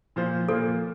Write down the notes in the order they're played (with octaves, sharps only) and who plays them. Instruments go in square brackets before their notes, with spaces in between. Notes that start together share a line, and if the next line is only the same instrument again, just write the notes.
[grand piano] A#2 F3 A#3 F4 C5
[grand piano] A#2 F3 A#3 F4 C5 [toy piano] A4